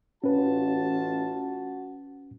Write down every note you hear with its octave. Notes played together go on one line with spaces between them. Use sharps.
A1 C#4 F4 F#4 B4 A5